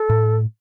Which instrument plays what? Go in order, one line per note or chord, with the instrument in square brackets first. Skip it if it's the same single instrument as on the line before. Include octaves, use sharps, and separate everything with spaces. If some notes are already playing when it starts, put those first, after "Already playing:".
Already playing: [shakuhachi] A4
[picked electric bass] A2